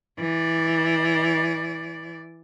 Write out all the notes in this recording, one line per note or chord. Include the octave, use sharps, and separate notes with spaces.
E3 D5